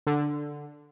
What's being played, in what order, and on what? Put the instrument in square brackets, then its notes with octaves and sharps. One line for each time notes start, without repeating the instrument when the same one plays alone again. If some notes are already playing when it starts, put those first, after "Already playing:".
[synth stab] D3